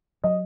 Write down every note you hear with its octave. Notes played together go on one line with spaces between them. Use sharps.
F#3 D#5